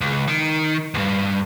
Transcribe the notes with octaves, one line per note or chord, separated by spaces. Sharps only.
C#2
D#3
D2 G2